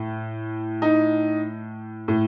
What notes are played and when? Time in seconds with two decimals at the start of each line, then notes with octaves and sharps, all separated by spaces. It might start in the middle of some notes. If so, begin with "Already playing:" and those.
Already playing: A2
0.82 D#4
2.08 A2